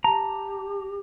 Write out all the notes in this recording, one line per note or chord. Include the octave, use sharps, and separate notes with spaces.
G4 A5 A#5